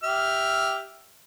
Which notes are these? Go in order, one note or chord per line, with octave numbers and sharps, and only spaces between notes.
G4 E5 F6